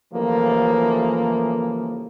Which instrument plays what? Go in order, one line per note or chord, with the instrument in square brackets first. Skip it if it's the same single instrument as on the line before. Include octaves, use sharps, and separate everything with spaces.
[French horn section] C#3 E3 F3 G3 A3 A#3